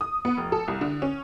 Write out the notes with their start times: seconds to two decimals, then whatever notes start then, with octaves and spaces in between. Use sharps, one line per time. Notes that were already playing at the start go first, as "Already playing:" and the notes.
0.01 D#6
0.25 B3
0.37 F1
0.52 A4
0.68 C2
0.81 D3
1.02 C#4